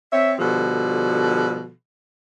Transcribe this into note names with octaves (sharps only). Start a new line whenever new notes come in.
C4 C#5 E5
B2 D3 F3 G3 F#4 A4